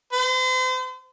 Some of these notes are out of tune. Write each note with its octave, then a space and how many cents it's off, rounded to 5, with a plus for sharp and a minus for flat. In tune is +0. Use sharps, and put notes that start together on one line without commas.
C5 -40